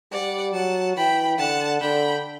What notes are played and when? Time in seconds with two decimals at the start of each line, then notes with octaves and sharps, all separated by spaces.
0.12 G3 D5 F#5
0.54 F#3 F#5 A5
0.96 E3 G5 B5
1.38 D3 F#5 A5
1.81 D3 G5 B5